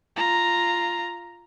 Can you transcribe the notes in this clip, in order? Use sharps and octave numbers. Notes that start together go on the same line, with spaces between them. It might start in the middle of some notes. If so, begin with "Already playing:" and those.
F4 A#5